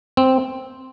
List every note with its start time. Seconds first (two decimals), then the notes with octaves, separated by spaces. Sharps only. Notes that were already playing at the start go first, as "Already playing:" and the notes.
0.17 C4